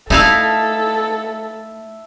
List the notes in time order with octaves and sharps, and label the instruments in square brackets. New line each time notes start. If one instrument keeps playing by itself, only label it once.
[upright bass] A3 [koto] D#4 E4 F5 [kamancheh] A4 [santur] E5 A5